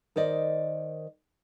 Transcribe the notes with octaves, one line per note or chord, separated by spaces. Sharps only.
D#3 C5 D5 D#5